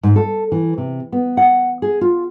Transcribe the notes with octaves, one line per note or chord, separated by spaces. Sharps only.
G#2
A4
E3
C3
B3
F#5
G#4
F4